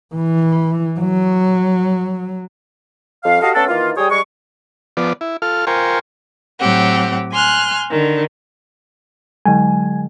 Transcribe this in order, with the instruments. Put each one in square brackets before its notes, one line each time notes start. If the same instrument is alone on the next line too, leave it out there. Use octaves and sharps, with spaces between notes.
[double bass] E3
F#3
[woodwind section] F2 F5
F#4 G4 A4 D#5 F5
A3 B3 C#4 D4 A4
D#3 E3 A#3 F4
G3 G4 G#4 C#5 G5 D#6
G3 G#3 C#6
[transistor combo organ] F3 B3 D5
E4
F4 A4 F6
F4 A#4 C5 G5 G#5 C#6
[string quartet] A2 F#3 C4 G4 F#5
G#5 C6 F6 F#6
D3 D#3
[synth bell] D3 F#3 G#3 [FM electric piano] G#5